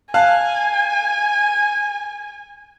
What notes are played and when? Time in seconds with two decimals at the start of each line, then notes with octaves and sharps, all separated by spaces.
0.14 F5 G#5 A5 F#6